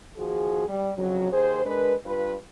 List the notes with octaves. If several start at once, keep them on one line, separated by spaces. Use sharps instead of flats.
D#2 F3 F#4 G#4
G3
F2 C#3 F#3
D#2 G#4 C5
G#3 D4 A#4 B4
G2 F4 B4